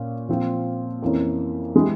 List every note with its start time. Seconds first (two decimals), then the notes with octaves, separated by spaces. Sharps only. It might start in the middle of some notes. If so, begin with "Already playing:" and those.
Already playing: A#2 C#4
0.29 A#2 F3 C4 F4
1.02 F2 E3 A#3 C#4
1.75 E3 G#3 E4 G4